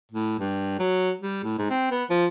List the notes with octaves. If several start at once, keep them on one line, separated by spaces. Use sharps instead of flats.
A2
G2
F#3
G3
A2
G#2
C4
B3
F3